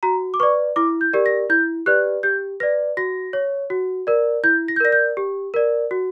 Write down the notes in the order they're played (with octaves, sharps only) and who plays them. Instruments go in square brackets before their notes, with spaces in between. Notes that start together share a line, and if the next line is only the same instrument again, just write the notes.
[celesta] F#4 A#5
D6
B4 D5 C#6
E4 D6
G6
G4 A#4 D5
A#6
E4 G6
G4 B4 D5 F#6
G4 G6
B4 D5 A#6
F#4 A#6
C#5
F#4
A#4 D5
E4 G6
A#6
G6
A#4 D5 A#6
G6
G4
A#4 D5
F#4